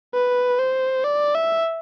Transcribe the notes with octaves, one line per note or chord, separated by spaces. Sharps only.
B4
C5
D5
E5